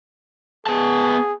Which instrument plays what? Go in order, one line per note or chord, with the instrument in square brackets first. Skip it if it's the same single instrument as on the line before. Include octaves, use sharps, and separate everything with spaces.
[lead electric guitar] B3 A5 [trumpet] G#4